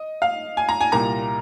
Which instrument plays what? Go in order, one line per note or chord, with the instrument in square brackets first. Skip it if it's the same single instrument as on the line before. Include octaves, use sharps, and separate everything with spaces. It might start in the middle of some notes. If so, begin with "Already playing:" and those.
Already playing: [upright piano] D#5
F5
G#5
A#5
G#5
C2 A#2 G3 A#3 A#5